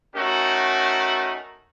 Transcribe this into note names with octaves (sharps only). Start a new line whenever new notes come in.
A3 C#4 D#4 F#4 A#4